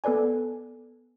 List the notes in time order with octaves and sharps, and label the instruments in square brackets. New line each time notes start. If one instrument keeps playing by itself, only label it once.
[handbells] B3 A4 B4 D5 G#5